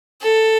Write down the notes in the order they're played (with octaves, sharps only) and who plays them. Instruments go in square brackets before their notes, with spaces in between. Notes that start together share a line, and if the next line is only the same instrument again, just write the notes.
[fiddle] A4